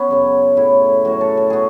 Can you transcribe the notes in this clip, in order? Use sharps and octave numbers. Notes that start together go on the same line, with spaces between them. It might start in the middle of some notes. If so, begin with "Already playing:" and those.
Already playing: B3 C#4
F#2 C#3 F#3
A2 F#3 E4
A2 F#3 F#4
A4
A4
B2 F#4 G#4